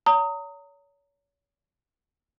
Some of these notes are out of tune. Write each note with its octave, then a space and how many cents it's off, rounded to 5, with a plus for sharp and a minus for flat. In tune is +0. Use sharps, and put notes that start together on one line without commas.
C#5 +40 A#5 -25 D#6 +15